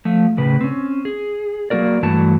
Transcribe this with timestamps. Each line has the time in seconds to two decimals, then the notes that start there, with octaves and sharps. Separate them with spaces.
0.05 F3 A3
0.37 A2 C#3 B4
0.61 C4 C#4
1.05 G#4
1.70 F#3 A#3 F#4 A#4 D5
2.03 G2 E3 F#3 A3 F#4 A5